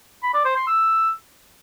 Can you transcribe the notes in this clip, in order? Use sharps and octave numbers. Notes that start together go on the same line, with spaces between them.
B5
D5
C5
C6
E6